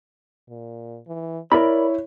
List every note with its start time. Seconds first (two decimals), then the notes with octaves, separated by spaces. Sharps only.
0.49 A#2
1.07 E3
1.52 E4 A#4 C#5 D5 B5